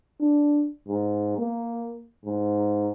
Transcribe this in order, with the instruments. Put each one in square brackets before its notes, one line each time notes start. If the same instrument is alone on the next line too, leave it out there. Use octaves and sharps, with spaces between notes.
[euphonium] D4
G#2
A#3
G#2